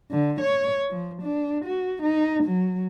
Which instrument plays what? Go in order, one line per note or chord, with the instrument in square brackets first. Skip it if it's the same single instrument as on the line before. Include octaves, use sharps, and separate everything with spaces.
[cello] D3
C#5
F3
D4
F#4
D#4
F#3